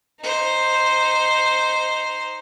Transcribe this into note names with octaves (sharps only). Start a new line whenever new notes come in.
D#4 C5